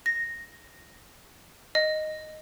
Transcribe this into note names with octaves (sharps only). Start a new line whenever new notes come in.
A#6
D#5